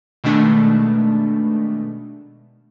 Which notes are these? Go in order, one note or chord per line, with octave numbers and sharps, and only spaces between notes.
B2 D#3 G#3 A3 D4